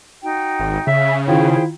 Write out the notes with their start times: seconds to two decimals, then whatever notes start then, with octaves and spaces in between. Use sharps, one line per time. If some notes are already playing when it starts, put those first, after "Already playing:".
0.23 D#4 F#4 G5
0.60 G#1
0.87 C#3 E5
1.27 D#3 E4 F4 G#4 C5 G5